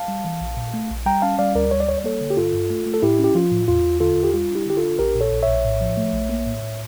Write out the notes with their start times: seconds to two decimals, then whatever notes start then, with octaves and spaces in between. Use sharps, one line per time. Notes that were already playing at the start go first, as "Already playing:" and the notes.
Already playing: F5 A5
0.08 G3
0.24 E3
0.41 A#1
0.57 A#2
0.74 A3
0.90 A#1
1.06 G3 G5 A#5
1.22 C#4 F5 A5
1.39 G3 D5 F5
1.55 D2 A#4 D5
1.71 G3 C#5
1.80 D5
1.88 G3 C#5
1.97 D5
2.04 A#3 A4 C#5
2.21 D3
2.30 G4
2.37 G2 F4 A4
2.54 G2
2.70 A3
2.86 A3
2.94 A4
3.02 A2 E4 G4
3.19 C#4
3.24 G4
3.35 F3 F4
3.52 A2
3.68 E2 F4
3.85 E2
4.00 D3 F4 A4
4.17 E2
4.24 G4
4.33 G3 F4
4.50 D4
4.55 E4 G4
4.66 D3 G4
4.77 F4 A4
4.83 D4
4.99 A#1 G4 A#4
5.15 A#2
5.21 A4 C#5
5.32 A#1
5.42 C#5 E5
5.48 A#1
5.64 A2
5.81 F3
5.97 A3
6.13 A#1
6.29 A#3
6.46 A2
6.62 A2